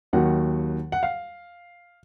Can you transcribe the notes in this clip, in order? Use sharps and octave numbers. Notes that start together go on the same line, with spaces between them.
D#2 D#3 F#3 F#5
F#5
F5